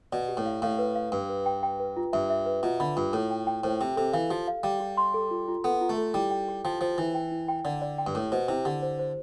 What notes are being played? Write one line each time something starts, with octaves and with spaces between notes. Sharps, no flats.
B2 D5
G4
A2
F5
A2 F5
B4
F5
G2 B4
B4
G5
G5
B4
F4
G2 E5
E5
B4
B2 F4
D3 B5
G2 F4
A2 A4
G5
G5
A2 C5
C3 G5
C3 A4
E3 F5
F3 G4
F5
G3 F5
G4
C6
A4
F4
F4
B3 A4
F4
A3
A4
G3 E4
G5
G4
F3 G5
F3 C5
E3 E4
G5
E4
G5
D3 D5
D5
G5
G2
A2 G4
B2 C5
C3 E4
D3 G4
C5
C5